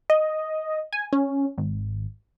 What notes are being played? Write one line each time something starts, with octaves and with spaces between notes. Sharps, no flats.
D#5
G#5
C#4
G#1